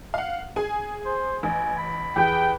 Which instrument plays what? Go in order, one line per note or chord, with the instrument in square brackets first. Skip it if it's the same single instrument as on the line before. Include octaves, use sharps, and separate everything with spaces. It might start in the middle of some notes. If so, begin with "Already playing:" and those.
[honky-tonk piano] F5 F#5
G#4 G#5
[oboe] C5
[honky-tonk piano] A1 [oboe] G#5
[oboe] B5
[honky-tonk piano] E2 G4 [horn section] G#4 B4 G5